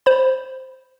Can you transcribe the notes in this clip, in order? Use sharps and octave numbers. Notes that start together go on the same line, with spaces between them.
C5 B5